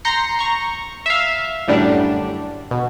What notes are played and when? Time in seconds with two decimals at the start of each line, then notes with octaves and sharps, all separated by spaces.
0.05 A#5 C6 G6 A#6 C7 C#7
0.39 A#5 C#6
1.06 E5 F5
1.68 F#2 A2 D3 G3 D4
2.71 B2